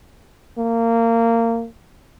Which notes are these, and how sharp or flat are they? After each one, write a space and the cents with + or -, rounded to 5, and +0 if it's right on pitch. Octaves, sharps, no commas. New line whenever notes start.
A#3 -20